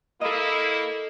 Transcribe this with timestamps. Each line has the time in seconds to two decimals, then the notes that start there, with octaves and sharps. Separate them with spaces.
0.21 A#3 E4 A4 D#5